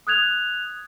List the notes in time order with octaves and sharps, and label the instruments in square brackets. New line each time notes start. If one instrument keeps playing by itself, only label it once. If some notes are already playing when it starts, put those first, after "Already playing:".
[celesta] D#6 F#6 G#6 F7